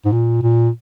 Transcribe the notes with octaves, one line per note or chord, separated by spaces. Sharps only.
G#2
A#2
A#2